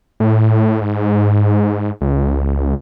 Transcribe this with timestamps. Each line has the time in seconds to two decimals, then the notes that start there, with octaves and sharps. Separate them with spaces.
0.20 A2
0.81 G#2
2.01 C#2